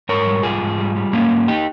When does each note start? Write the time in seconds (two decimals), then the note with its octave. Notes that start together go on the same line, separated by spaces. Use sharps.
0.09 G#2 A#4 C#5
0.27 G3
0.43 G#2 F4 G#4
0.62 G#2
0.78 G3
0.96 G3
1.13 G#2 A#3 C#4
1.31 G#2
1.48 D#4 G4